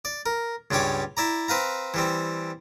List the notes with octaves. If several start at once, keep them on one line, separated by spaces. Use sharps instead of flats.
D5
A#4
C#2 G2 G3 G4 C#5 D6
E4 D5 A#5
C4 B4 F5 A#5
E3 G3 C4